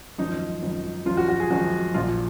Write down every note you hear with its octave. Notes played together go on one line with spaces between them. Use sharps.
G#1 F#2 F3 D#4
G#1 F#2 F3
G#1 F#2 F3 F4
F#4
F#4
G#4
G#1 F#2 F3 F#4
A#1 A#2 F3 F4